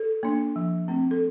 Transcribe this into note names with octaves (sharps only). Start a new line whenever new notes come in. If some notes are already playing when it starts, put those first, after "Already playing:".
Already playing: A4
A#3 D4
F3
A3 C4
A4